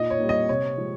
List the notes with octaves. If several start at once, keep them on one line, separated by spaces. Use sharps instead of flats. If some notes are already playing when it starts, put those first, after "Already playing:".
Already playing: A#2 D#5
C#5
G3 A#3
D#5
C3 C#5
F3 G#3